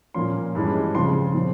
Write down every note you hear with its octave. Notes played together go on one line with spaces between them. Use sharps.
A#2 F3 A#3 C#4 C6
G2 E3 G#3 C#4
C#3 F3 C4 C6
A#2 F3 C4